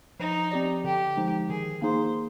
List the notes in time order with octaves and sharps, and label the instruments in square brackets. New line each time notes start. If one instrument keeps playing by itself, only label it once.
[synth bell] F3 [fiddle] D#4
[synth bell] C4 G4 D5
[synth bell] D3 [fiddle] G4
[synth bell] F3 G#3 D#4
[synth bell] D#3 [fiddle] G#4
[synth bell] A#3 D#4 G#4 [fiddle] C5